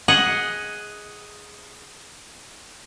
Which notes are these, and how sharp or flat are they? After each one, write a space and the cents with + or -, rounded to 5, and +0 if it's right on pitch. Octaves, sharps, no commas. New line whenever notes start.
G#4 +0 D#5 +15 F#5 +0